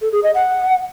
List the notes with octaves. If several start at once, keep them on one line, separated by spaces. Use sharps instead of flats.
A4
G#4
D#5
F#5